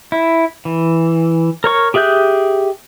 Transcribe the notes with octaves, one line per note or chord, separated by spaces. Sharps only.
E4
E3
A#4 C#5 C#6
G4 G#4 E5 F#6 G6